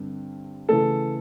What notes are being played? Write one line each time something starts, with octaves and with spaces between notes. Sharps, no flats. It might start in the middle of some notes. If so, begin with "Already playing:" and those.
Already playing: G2 D3 C4
C#3 E3 A3 A4